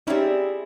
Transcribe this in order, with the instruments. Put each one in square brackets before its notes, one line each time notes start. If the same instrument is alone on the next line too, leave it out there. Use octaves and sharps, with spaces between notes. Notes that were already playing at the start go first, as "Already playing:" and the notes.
[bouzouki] G3 C4 E4 G#4 [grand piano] C#4 D#4